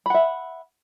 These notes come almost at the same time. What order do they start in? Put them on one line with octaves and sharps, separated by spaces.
B5 F#5 E5